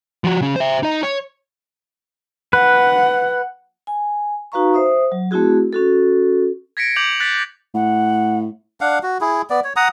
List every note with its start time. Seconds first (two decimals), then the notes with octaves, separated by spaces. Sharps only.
0.24 F3 F#4
0.41 C#3 C#4
0.56 C5 E5
0.83 D#4 D#5
1.03 C#5
2.53 B4 F#5
3.87 G#5
4.52 D#4 F#4 B4 F5 A#5 C#6
4.74 C5 E5 D#6
5.12 F#3
5.31 A3 C4 E4 F#4 G#4
5.73 C#4 F#4 A4
6.77 G#6 A#6 B6 C#7 D7
6.96 D6 G6 F7 F#7
7.20 F#6 A6 B6
7.74 A2 F#5
8.81 D4 F5 F#5
9.03 F#4
9.21 E4 G#4
9.50 B3 D5
9.64 C#5
9.76 F#5 A#5 D#6